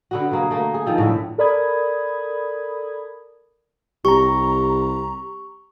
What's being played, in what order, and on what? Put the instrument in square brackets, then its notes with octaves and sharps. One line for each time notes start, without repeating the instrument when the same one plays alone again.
[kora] D3 B3 F#4
B2 A#3 G#4
A3 A#3
G#4
D#3 F3 C4
A2 D3 E5
[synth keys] A4 A#4 D5 B5 D#6 G#6
[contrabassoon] C2 [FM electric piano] G4 A#5 [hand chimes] C#6